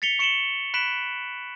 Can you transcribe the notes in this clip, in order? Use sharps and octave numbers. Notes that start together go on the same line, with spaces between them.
A6 B6 C#7 F7 G7
C#6 C#7 D7 E7 F#7 G7
B5 F#6 B6 D7 E7 F#7